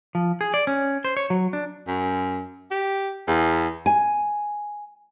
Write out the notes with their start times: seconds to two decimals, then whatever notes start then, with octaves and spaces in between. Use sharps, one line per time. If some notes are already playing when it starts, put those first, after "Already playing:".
0.15 F3
0.41 G#4
0.54 D5
0.67 C#4
1.05 C5
1.17 C#5
1.30 F#3
1.53 D4
1.88 F#2
2.71 G4
3.28 E2
3.86 G#5